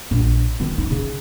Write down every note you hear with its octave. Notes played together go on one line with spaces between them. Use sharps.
A#1
D#3 B3
D#4
C#3